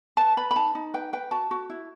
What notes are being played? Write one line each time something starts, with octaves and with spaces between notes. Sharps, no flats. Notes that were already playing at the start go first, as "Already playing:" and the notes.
B4 A5
B4 B5
B5
D#4 A5
D#4
B4 G5
B4 G5
F#4 A5
F#4
E4